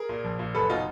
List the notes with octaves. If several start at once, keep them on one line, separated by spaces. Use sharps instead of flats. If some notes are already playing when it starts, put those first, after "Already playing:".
Already playing: G#4 A#4
A#2
A#1
A#2
F#1 A4 B4
B2 D#4 F4